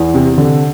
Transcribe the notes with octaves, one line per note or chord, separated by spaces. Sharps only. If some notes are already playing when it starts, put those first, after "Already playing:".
Already playing: E2
C3
D3